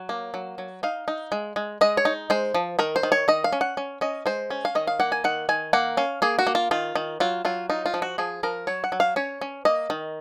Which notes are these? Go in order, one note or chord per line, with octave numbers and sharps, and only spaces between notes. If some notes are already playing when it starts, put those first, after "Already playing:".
Already playing: F#3
A#3
F#3
F#3
D#4 F5
D#4
G#3
G#3
G#3 D#5
C#5
D#4
G#3 C5
F3
D#3 A#4
C5
D#3
C#5
D#3 D#5
F5
C#4
F#5
C#4
C#4 D#5
G#3 C5
C#4
F5
D#3 D#5
F5
A#3 F#5
G#5
D#3 F#5
D#3 G#5
A#3 F#5
C#4 F5
A#3 G#4
F#4
A#3
F4
D#3 F4
D#3
F#3 F4
F#3 F4
D#4 F4
F4
F3
F#4
F3 G#4
F3 A#4
F#3 C#5
F#5
F#3
F5
C#4 C#5
C#4
A#3 D#5
D#3